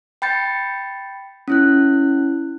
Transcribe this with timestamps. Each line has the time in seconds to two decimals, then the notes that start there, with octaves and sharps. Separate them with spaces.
0.22 G5 B5 G6 A6 C#7
1.48 C#4 E4 F#6